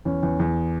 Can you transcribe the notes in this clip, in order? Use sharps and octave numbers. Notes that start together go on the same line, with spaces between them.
E2 C#4
E2
E2